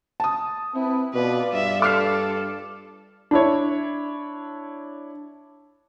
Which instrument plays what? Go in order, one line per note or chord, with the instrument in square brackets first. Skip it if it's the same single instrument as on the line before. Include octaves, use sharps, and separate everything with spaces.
[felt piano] A5 D#6
[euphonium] C4 [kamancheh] E4 B4
[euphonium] B2 [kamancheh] F4 D5 [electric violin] B4
[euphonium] G2 [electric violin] E5
[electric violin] A4 [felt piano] D6 F6 C7
[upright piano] D4 E4 C#5